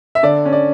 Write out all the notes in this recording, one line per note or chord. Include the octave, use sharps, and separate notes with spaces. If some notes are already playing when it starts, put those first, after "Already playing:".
E5
D3 D5
C#4
D5